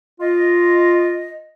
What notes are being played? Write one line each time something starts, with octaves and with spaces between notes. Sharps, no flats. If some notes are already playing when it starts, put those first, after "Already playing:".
F4 D#5